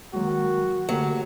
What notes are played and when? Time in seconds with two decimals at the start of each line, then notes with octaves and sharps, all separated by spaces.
0.14 D#3 F#3 G#3 A#3 F#4
0.89 D3 F#3 A3 A#3 G4